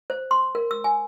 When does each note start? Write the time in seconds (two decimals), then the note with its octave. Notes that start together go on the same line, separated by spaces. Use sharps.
0.10 C5
0.31 C6
0.55 A#4
0.71 E6
0.84 G#5